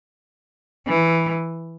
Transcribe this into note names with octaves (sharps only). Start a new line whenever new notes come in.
E3